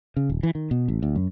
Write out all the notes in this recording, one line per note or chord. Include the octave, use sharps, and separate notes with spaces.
C#3
D#1
E3
D#3
B2
A1
D2
F#2